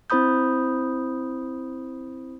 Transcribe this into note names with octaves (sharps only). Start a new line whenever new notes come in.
C4 E4 C5 B5 D#6 G6